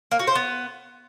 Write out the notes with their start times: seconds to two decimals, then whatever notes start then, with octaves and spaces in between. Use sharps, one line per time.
0.11 A#3
0.19 F#4
0.27 C5
0.35 B3